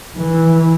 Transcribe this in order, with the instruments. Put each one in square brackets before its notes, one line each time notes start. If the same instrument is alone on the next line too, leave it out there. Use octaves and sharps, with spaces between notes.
[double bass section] E3